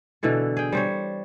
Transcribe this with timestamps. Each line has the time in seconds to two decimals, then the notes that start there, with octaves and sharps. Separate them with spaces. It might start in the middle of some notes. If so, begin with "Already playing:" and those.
0.23 B2 D3 E3 A4
0.57 G#4 G5
0.72 G3 C5 C#5